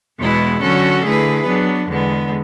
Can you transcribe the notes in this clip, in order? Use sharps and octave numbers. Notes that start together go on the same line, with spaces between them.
E2 B2 G#3 B3 E4
D3 F#3 C#4 F#4 A4
D3 A3 E4 G#4 B4
F#3 B3 D4
E2 D3 G#3 B3